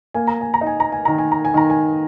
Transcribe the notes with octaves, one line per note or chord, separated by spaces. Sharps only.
A#3 G#5
A#5
G#5
A#5
D#4
G#5
A#5
G#5
D#3 A#5
G#5
A#5
G#5
D#3 A#5
G#5